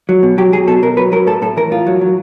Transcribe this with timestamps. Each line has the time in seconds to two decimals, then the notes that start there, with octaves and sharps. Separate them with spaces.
0.09 F#3
0.23 B2
0.38 F#3 G4
0.53 F#3 G#4
0.67 B2 A4
0.82 B2 A#4
0.97 F#3 B4
1.12 F#3 A#4
1.27 A2 A4
1.42 A2 A4
1.57 E3 A#4
1.71 A2 F4
1.86 F#3
2.01 F#3